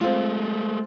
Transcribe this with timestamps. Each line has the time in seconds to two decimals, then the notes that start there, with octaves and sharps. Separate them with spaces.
0.01 G#3 A3 C4 F4